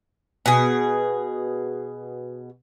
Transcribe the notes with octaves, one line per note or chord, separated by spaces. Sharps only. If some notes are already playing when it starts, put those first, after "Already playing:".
B2 G#4